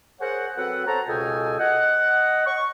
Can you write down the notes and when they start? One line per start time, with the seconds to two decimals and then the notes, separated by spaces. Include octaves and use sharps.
0.20 G#4 A#4 C5 C#5 F#5
0.56 F#3 C4 A4 B4 F#5
0.87 A4 C5 C#5 F#5 A5 A#5
1.07 C#2 B2 A4 D#5 G5 G#5
1.59 D#5 F#5
2.46 C#6